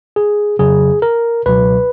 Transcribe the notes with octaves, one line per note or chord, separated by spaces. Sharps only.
G#4
F2 C#3 F#3 G#4
A#4
C#2 B2 F#3 B4